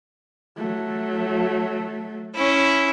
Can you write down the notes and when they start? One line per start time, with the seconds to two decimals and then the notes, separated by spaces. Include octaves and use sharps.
0.57 F#3 A3
2.35 C#4 E4